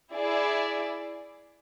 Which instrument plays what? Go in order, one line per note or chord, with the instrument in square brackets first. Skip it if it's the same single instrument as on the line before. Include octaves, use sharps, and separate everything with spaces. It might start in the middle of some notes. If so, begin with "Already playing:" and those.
[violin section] E4 G#4 D5